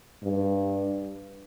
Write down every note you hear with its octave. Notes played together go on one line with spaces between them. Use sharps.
G2